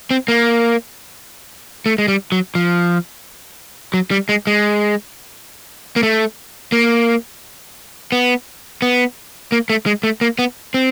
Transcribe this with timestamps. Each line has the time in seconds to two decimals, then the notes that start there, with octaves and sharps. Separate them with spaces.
0.11 C4
0.28 A#3
1.86 A3
1.98 G#3
2.08 G3
2.32 F#3
2.55 F3
3.94 F#3
4.11 G3
4.29 G#3
4.47 G#3
5.96 A#3
6.03 A3
6.72 A#3
8.12 B3
8.82 B3
9.52 A#3
9.70 A3
9.86 G#3
10.03 A3
10.21 A#3
10.39 B3
10.74 C4